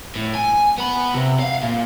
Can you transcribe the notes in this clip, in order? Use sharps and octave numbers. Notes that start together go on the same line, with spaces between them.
A2
G#5
B3 B5
C3
F5 F#5
A#2